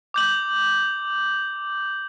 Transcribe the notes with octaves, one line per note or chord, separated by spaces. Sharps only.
D6 G6 F#7